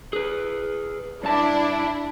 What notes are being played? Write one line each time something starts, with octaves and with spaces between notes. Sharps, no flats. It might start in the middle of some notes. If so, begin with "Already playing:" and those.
G#4 B4
G2 D4 E4 A5